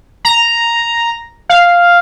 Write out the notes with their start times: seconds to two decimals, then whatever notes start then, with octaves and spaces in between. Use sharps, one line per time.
0.25 A#5
1.50 F5